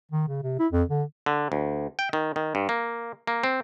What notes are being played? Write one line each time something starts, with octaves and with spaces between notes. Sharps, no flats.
D#3
C#3
C3
E4
F2
D3
D3
D2
G5
D#3
D#3
G2
A#3
A#3
C4